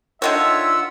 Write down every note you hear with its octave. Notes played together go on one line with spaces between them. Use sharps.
D3 D#3 F4 C#5 E5 F#5 E6